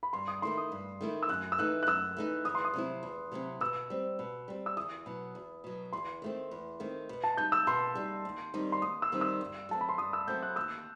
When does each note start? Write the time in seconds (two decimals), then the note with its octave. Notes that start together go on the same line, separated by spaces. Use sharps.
0.03 B5
0.13 G2 C6
0.28 D#6
0.42 D#3 A3 E4 C6
0.57 D#6
0.72 G2
1.01 D#3 A3 E4
1.23 E6
1.29 F#2 F#6
1.52 E6
1.58 E3 A3 D#4 F#6
1.83 F#6
1.87 F#2 E6
2.17 E3 A3 D#4
2.45 E2 D#6
2.55 C6
2.64 D#6
2.74 C3 F#3 C4 E4
3.03 E2
3.31 C3 F#3 C4 E4
3.61 B2 E6
3.90 G3 C4
4.19 B2
4.48 G3 C4
4.66 E6
4.77 E2 D#6
5.06 B2 F#3
5.35 E2
5.64 B2 F#3
5.93 E2 C6
6.22 D#3 A3 C4
6.51 E2
6.80 D#3 A3 C4
7.09 B2
7.24 A5
7.37 G3 D#4 G6
7.52 E6
7.67 B2 C6
7.95 G3 D#4
8.25 D#2
8.54 D#3 G3 C4 D#4
8.72 C6
8.82 D#2 D#6
9.02 E6
9.12 D#3 G3 C4 D#4
9.21 E6
9.41 G2
9.69 F#3 A3 C4 A5
9.81 B5
9.89 C6
9.98 G2 D#6
10.13 E6
10.28 F#3 A3 C4 G6
10.42 F#6
10.56 D#2 E6